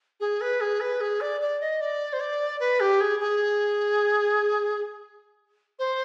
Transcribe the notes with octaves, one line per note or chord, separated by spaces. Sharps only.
G#4
B4
G#4
B4
G#4
D5
D5
D#5
D5
C5
D5
B4
G4
G#4
G#4
C5